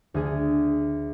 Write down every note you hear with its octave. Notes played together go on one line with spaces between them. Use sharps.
D2 G#4